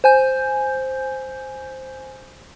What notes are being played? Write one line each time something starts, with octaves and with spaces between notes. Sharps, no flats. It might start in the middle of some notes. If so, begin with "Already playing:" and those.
C5 G#5 G6